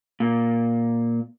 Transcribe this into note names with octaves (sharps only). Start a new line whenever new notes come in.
A#2